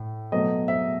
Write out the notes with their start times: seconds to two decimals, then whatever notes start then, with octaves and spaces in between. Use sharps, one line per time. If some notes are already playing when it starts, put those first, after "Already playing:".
Already playing: A2
0.32 B2 F#3 A3 D#5
0.68 E5